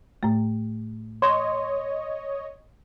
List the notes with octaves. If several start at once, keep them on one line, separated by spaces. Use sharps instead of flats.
A2 A3
C#5 D#5 C6